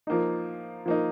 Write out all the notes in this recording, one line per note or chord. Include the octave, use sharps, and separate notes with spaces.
F3 A#3 D#4
F3 A#3 D#4